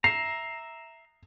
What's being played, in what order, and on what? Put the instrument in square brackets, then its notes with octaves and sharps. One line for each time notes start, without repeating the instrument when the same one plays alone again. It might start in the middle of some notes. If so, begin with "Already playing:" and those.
[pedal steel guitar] E5 A#5 [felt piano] C7